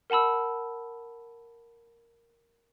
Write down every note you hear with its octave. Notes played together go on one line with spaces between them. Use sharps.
A#4 F#5 A5 B5 E6